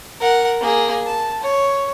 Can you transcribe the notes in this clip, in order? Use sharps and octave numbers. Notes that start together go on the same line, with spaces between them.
A#4 F#5
A#3 G#4
A5
C#5